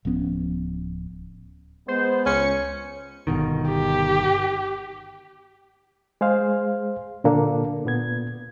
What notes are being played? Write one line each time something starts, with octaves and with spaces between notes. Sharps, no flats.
D1 F3 B3 C#4
G#3 B3 C5
C#2 C#4 C#7
G1 B2 D#3
G4
G#3 G#4 C5 F5
A#2 D3 A#3 D4 A4
A#2 B3 G#6